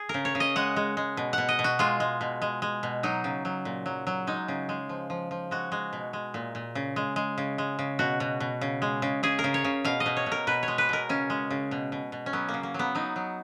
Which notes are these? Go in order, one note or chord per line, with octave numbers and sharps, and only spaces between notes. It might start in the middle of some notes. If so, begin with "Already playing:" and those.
Already playing: G#4
C#3 A#4
C#5
C#3
D#5
G#3 F#5
G#3
G#3
B2
B2 F#5
D#5
B2
F#4
G#3 F4
G#3
B2
G#3
G#3
B2
F#3 D#4
C#3
F#3
A#2
F#3
F#3
G#3 D#4
C#3
G#3
F3
F3
F3
G#3 F#4
G#3
B2
G#3
A#2
A#2
C#3
G#3
G#3
C#3
G#3
C#3
B2 F#4
B2
B2
C#3
G#3
C#3
C#3 G#4
A#4
C#3
C#5
C#3
B2 F5
D#5
B2
C#5
B2
A#4
B2 B4
C#5
G#3
B4
B2 A#4
C#3 C#4
G#3
C#3
B2
B2
B2
C#4
F#3 B3
A#3
C#3
A#3
F#3 B3
F#3 D#4
F#3